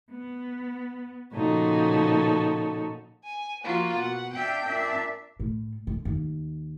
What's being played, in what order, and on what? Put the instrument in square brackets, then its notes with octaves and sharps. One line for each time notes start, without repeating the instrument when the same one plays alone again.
[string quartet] B3
A#2 C#3 F3 D#4 F#4 A4
G#5
F3 A#3 F4 F#4
B2 F#5
D4 E5 F5 G5
A#2 D4 E5
[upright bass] A2
D3
D#2